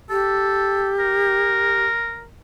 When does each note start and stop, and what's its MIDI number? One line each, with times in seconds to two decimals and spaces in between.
0.10 1.84 67
0.10 0.91 69
0.99 2.26 70